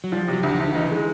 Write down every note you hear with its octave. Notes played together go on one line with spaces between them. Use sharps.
F#3
F3 G3
C3 F#3
D2
F3
D2
D#3
E3 D#4
G#3